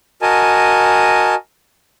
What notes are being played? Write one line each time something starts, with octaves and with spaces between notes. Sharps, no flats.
F#4 A#4 D#5 G#5 A5